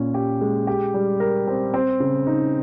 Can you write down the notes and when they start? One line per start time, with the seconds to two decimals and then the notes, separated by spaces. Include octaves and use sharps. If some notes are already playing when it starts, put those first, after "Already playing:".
Already playing: A#2 C#4
0.14 G4
0.41 G#3
0.67 G4
0.94 G3
1.20 A#4
1.47 C4
1.74 C4
2.00 C#3
2.27 D#4